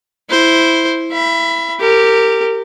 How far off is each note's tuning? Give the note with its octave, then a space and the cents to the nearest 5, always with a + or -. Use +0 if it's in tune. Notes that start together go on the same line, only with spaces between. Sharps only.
E4 +0 C5 +0
E5 +30 B5 +0
G4 +0 A#4 -25